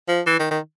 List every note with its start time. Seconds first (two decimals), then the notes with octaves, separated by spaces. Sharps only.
0.08 F3
0.26 E3
0.39 D#3
0.51 D#3